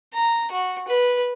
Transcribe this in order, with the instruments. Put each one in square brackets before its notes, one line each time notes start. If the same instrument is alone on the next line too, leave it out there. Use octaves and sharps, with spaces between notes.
[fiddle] A#5
F#4
B4